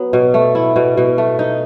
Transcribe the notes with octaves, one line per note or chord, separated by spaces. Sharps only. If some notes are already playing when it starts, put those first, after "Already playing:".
Already playing: F#3 B3
B2
A3
E4
B2
B2
A3
D#4